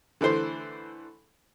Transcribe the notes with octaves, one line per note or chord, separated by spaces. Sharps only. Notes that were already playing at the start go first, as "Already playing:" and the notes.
D3 E3 A3 C5